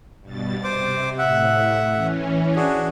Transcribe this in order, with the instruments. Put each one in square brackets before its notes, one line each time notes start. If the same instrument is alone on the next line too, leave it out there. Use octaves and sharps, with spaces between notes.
[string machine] G2 B2 A6
[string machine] C3 [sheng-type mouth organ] C5 D6
[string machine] A2 [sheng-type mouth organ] E5 F#5
[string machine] E3 C#4
[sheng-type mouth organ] D4 F#4 G#4